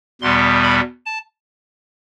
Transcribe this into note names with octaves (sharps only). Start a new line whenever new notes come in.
E2 B2 G3 B3 C6
B5
A5